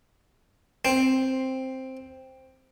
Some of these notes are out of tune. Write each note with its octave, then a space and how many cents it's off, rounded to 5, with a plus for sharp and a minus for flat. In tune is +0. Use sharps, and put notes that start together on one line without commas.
C4 +5